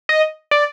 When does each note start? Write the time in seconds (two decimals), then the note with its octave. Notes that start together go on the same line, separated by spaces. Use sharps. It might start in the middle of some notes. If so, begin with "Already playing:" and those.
0.09 D#5
0.51 D5